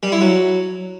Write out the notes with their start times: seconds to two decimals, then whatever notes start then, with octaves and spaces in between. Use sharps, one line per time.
0.03 G3
0.12 E4
0.21 F#3